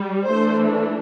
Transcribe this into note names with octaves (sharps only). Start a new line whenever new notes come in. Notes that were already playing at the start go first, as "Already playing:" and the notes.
Already playing: G3
E3 A3 D4 C5